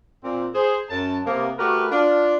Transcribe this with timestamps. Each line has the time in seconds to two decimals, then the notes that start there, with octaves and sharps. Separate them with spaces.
0.22 A#2 C4
0.54 G#4 C5
0.89 F#2 A5
1.25 C3 A#3 B3
1.58 A3 F#4 G4 A#4 B4
1.90 D4 F4